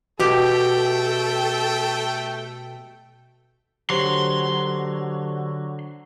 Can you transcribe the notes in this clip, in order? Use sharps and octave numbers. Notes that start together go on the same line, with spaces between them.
B2 A3 F#4 G4 A4 G5
D3 F#3 G4 C5 C6